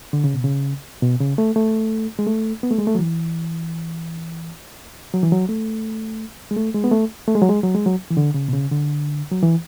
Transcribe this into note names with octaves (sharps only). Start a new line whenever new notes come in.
D3
C#3
B2
C#3
B2
C#3
A3
A3
G#3
A3
B3
A3
G#3
A3
F#3
E3
F#3
E3
F#3
A3
G#3
A3
G#3
B3
A3
A3
G#3
F#3
G#3
F#3
G#3
F#3
E3
D3
C#3
B2
C#3
D3
F#3
E3